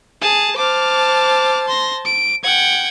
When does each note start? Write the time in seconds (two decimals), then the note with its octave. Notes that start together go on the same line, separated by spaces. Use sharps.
0.22 G#4 A5
0.58 C5 A5 D6 F6
1.68 C6 A#6
2.05 D7
2.44 F#5 G5 G#6